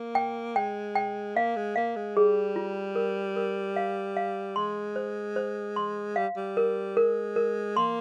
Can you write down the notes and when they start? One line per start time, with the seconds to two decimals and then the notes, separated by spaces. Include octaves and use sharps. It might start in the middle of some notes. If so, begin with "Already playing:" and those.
Already playing: A#3
0.15 G5
0.56 G#3 G5
0.96 G5
1.36 A#3 F5
1.56 G#3
1.76 A#3 F5
1.96 G#3
2.16 G3 G#4
2.56 F4
2.96 A#4
3.36 A#4
3.76 F5
4.17 F5
4.56 G#3 C6
4.96 C5
5.36 C5
5.76 C6
6.16 G3 F5
6.37 G3
6.57 A#4
6.97 G#3 A#4
7.36 A#4
7.77 A#3 C6